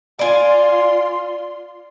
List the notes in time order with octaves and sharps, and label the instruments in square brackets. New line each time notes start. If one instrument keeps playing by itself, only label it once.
[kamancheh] F4 C6 [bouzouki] D5 G#5